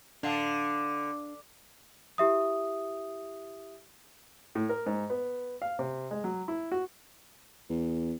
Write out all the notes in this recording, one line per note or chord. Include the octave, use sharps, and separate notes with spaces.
D3 D4 F5 A5
E4 G4 E5 D#6
A2
A#4
G#2
B3
F5
C3
G#3
F#3
E4
F#4
E2